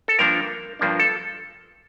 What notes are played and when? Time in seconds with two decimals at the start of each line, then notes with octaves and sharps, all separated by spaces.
0.08 A4
0.19 G2 F3 A#3 D4 A#4
0.79 G2 F3 A#3 D4
1.00 A4